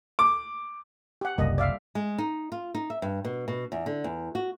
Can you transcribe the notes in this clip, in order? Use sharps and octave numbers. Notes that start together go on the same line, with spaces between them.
D6
G4 F#5
F#1 C2 G3 A#3 D#5
D5 E5 F5
G#3
D#4
F4
D#4
E5
G2
B2
B2
E2
D3
E2
F#4